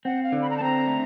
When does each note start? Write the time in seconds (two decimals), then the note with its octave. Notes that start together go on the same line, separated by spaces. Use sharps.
0.05 C4 F#5
0.23 F5
0.32 D3
0.42 B5
0.50 A#5
0.57 A5
0.61 C4 A#5
0.87 A3